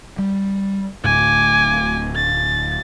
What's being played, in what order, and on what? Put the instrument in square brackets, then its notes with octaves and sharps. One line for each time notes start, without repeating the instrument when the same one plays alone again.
[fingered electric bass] G3
[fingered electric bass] D1 D2 A2 [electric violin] G#5 D6
[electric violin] A6